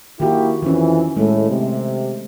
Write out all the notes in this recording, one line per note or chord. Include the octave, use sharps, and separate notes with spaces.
D#3 A#3 E4 F#4 G4
F2 D#3 E3 C#4
A2 G#3 A3
C3